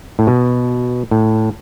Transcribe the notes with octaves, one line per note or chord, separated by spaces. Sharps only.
A2
B2
A2